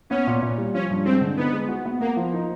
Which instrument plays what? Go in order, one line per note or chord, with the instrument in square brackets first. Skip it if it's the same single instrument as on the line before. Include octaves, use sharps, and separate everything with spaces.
[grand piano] B3 [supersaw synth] C#4
[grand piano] A#2
A#2
G3
[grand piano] F3 [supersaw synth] C#4
[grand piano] G2
[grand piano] G#3 [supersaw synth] C4
[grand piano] D3
[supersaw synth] B3 [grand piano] D#4
[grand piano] G#3
F#4
B3
[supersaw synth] A#3 [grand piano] B3
[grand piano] F3
D#4